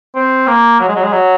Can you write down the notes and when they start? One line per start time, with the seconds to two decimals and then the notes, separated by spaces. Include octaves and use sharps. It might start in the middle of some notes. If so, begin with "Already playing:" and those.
0.15 C4
0.47 A#3
0.80 F#3
0.88 G#3
0.96 F#3
1.04 G#3
1.12 F#3